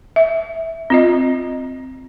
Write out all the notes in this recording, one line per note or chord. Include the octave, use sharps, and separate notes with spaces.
E5
C4 F4 D#5